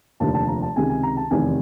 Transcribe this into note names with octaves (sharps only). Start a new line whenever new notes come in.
F1 D#2 D3 F3 A#3 A5
A5
A#5
A5
C#2 C3 D#3 G#3 G#5
G#5
A#5
A5
F1 E2 C3 D#3 G#5